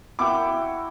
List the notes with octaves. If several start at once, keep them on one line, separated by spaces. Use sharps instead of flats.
E4 F#4 G5 D6